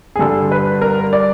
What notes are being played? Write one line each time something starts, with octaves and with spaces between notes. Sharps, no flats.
G#4
G2 D3 G3 A4
B4
A#4
D5